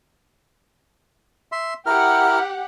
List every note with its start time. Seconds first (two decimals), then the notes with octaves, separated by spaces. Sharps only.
1.52 E5 C6
1.86 E4 G4 A#4 F#5 F6